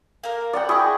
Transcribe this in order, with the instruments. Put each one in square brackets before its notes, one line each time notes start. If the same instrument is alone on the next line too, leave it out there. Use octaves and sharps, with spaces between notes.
[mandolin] A#3 A#4
[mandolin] F#4 [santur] D5 F#5 G5
[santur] E4 G#4 C#6 [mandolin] D#5 G5